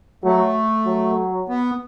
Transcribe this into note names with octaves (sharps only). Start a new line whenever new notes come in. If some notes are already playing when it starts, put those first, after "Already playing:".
F#3 A3
F#3
B3